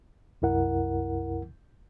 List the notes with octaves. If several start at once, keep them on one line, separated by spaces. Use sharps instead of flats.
C2 F#2 E4 A#4 F#5